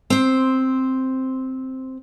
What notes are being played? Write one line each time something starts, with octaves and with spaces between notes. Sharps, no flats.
C4 C5